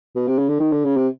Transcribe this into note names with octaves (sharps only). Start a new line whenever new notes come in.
B2
C3
C#3
D3
D#3
D3
C#3
C3